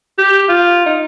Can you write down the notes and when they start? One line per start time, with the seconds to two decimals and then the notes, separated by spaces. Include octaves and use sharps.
0.18 G4
0.49 F4
0.86 D#4